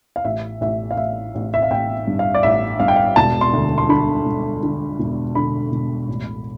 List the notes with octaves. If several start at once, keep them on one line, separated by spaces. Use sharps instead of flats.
F5
A1 E5
A1 E5
F5
A1 E5
A1
E5
F5
A1 G5
G2
F5
D5
A1 E5
G2 F5
G5
F5
E1 A5
C6
D2
C6
D3 B5
E1
D3
E1
D3 B5
E1
A1